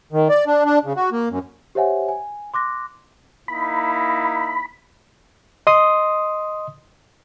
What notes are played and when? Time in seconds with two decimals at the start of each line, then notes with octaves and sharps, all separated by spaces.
0.13 D#3
0.29 D5
0.47 D4
0.65 D4
0.85 C#3
0.96 F#4
1.12 A#3
1.30 F#2
1.75 G4 C5 C#5 E5 F#5 G#5
2.09 G#5
2.54 C6 D6 F#6 A#6
3.48 A#3 D#4 E4 B5
5.67 D#5 C6 D#6